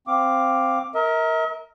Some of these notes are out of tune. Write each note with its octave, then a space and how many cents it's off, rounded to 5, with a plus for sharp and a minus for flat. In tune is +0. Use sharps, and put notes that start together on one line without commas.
C4 +0 F5 +0 D6 +5
A#4 +0 E5 -45